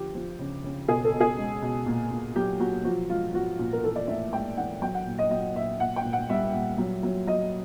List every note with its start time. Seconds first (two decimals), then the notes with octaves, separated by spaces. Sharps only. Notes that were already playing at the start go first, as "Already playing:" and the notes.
Already playing: D3 F3 G4
0.15 F3
0.39 C#3
0.64 C#3
0.88 B2 G#4
1.05 A4
1.13 B2
1.20 G#4
1.38 G#3
1.62 B2
1.86 A#2
2.11 A#2
2.36 F#3 G4
2.60 F#3 F#4
2.84 F3 F#4
3.09 G#3 F4
3.34 F3 F#4
3.59 A#2
3.73 A#4
3.83 E3 A4
3.96 D5
4.07 A2 E5
4.32 G#3 G5
4.57 E3 F#5
4.82 F#3 G5
4.94 F#5
5.06 A#2
5.19 D#5
5.30 F#3 D#5
5.55 A#2 E5
5.80 A#2 F#5
5.96 G5
6.05 A#2
6.13 F#5
6.30 G3 E5
6.54 A#2
6.78 F#3
7.03 F#3
7.27 F#3 D#5